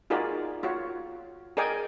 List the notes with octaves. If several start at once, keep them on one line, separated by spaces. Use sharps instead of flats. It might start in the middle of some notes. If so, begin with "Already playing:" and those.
D#4 F4 F#4 G#4 A#4 D5
F4 F#4 C#5
G#4 A#4 D5 D#5 G5 G#5